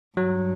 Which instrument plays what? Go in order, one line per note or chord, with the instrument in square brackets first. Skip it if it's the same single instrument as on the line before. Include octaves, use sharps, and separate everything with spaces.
[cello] G2 [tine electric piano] F#3